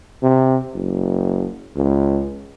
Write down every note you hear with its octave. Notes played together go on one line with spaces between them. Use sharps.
C3
F#1
C#2